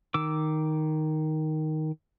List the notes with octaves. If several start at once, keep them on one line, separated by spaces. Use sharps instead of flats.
D#3 D6 E6